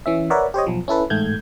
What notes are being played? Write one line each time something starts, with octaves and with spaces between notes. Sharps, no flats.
E3 C#4 E5
A#4 B4 C#5 D5 E5 F#5
G4 C5 C#5 D#5
B1 F3
C#4 E4 A4 B4
A1 G#2 A3 G6 G#6